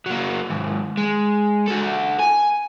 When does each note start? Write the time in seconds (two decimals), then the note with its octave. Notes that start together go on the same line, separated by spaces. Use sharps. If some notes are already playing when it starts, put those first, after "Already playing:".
0.06 F#3 A#3
0.50 D#2 G#2
0.97 G#3
1.68 F#4 A4
2.20 G#5